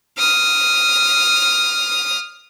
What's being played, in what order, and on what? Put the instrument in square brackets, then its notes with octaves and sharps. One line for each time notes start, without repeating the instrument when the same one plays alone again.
[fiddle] D#6 F6